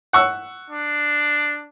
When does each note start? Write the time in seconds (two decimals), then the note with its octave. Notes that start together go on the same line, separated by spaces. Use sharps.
0.13 F#5 C#6 E6
0.70 D4